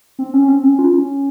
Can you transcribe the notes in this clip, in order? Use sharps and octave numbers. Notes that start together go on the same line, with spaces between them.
C4
C#4
C4
C#4
F4
C#4